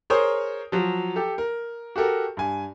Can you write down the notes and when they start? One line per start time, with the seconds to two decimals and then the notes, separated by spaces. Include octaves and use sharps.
0.10 G#4 A#4 C5 C#5 A#5 D#6
0.72 F3 F#3
1.16 G4 A4
1.38 A#4
1.96 F#4 G4 A4 A#4
2.37 G2 G#5